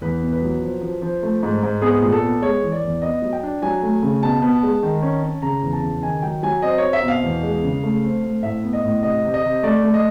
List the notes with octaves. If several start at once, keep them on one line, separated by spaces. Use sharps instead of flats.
E2 B4
B2
B4
F#3
F3
F3
F3
A3
G#2
G#2
B3 G#4
A#2
A4
B3
G#3 C#5
E3
D5
E2
B3 D#5
F#3
G5
D4
F#3 G#5
A3
C#3
B2 A5
B3
G#3
D#3
C#4
C#4
C#3 A#5
E2
A5
C#3
D#3 G#5
F#3 G5
F#3 G#5
C4 D#5
C4 C#5
E5
B2
F5
E2
G#3
C#3
A3
C4
A3
A2 E5
B3
D#5
A2
C3 D#5
C3
D#5
C3
A3 D5
A3
D#5